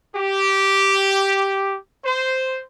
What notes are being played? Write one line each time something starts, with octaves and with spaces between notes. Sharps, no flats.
G4
C5